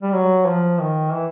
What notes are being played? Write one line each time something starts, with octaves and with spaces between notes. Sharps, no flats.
G3
F#3
F3
D#3
E3